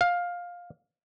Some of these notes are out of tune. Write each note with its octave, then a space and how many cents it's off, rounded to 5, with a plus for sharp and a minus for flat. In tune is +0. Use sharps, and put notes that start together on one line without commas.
F5 +15